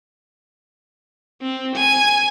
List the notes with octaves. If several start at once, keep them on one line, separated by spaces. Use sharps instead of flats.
C4
G#5